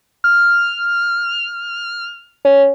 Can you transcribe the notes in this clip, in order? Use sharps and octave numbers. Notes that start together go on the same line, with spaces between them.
F6
C#4